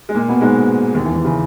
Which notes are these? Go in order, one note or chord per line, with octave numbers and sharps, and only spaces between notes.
G#3
A#2 A#3
B2 B3
G#2 G#3
D#2 D#3
E2 E3
D#2 D#3
C#3